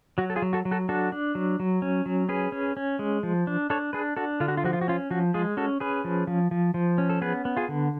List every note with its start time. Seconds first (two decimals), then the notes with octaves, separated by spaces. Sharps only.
0.18 F#3 F#4
0.30 A4
0.36 F4 G#4
0.42 F#3
0.53 F#4 A4
0.65 F#3
0.71 F#4 A4
0.89 D4 F#4 A4
1.12 D4
1.35 F#3
1.60 F#3
1.82 C#4
2.06 F#3
2.29 C#4 G#4 B4
2.52 C#4
2.77 C#4
2.99 G#3
3.23 F3
3.47 D4
3.70 D4 A4 C#5
3.93 D4 G#4 B4
4.17 D4 F#4 A4
4.40 D3 F4
4.48 F#4
4.57 F4
4.64 F3 F#4
4.73 F4
4.81 F#4
4.88 C#4 F4
5.11 F3 F#4
5.34 G#3 F4 G#4
5.57 C#4 F#4 A4
5.80 C#4 G#4 B4
6.05 F3
6.27 F3
6.51 F3
6.74 F3
6.98 C#4
7.10 A4
7.22 B3 G#4 B4
7.45 B3
7.57 F4 G#4
7.68 D3